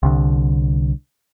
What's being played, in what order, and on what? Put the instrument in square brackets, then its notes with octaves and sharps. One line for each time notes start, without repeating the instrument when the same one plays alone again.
[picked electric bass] C2 D3